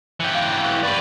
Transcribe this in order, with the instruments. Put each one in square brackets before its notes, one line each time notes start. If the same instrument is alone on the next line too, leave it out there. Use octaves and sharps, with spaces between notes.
[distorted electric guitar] E3 G4 [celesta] F#6 C#7
[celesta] F5
C#6 F#6
[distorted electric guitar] B4 D5